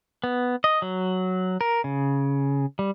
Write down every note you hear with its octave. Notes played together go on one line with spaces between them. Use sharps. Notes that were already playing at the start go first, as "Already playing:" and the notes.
B3
D#5
F#3
A#4
C#3
G3